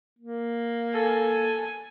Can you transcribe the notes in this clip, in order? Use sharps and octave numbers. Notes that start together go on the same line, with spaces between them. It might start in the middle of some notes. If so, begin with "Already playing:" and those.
A#3
A4 G#5